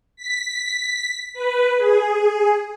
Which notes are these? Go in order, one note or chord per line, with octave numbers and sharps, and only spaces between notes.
B6
B4
G#4